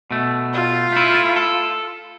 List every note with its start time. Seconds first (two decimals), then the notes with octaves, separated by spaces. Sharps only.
0.11 B2 A3
0.53 F4
0.92 A3 E4
1.36 A4